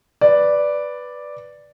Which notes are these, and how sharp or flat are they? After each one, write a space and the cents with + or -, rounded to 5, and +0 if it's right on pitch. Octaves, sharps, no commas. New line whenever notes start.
B4 +0 D5 +0